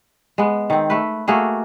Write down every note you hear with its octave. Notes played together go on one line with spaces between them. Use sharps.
G#3 B3
D#3 C4
A3 B4
A3 A#3 F#4 G#4